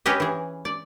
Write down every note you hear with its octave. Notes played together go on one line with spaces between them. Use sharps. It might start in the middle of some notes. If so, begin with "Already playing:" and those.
C#4 G4 G#4 B4 D#5
E3 G#4
D5